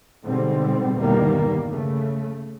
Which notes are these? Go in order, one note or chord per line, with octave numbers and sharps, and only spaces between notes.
G#2 B2 D3 G3 C4
G1 E2 B2 D#3 G3 A#3
C#3 A3